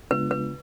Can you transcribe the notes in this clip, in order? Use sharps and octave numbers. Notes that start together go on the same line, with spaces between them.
C#3 G#3 B3 D4 F4 B4
B4